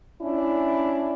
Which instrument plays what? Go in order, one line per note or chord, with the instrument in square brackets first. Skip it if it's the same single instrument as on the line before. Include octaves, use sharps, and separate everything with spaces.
[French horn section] C#4 D4 E4